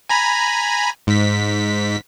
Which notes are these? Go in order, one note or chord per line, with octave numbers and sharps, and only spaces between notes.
G#5 A#5 B5
G#2 B6